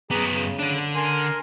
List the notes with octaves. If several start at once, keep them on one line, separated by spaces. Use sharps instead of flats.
F#2 B3 G#4 A#5 D6
C#3
D3 D4
A#4 G#5 C6